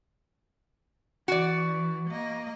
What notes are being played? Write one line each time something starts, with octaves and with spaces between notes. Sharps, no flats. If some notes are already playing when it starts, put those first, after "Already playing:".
E3 F#4 D5
A#3 D#5